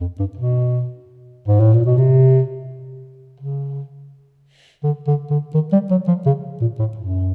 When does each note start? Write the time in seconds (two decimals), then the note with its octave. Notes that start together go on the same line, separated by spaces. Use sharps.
0.01 F2
0.20 G2
0.37 B2
1.48 G#2
1.60 A2
1.74 A#2
1.86 B2
1.98 C3
3.40 C#3
4.84 D3
5.07 D3
5.30 D3
5.54 D#3
5.73 G3
5.90 F#3
6.08 F3
6.26 C#3
6.61 A#2
6.79 A2
6.97 F#2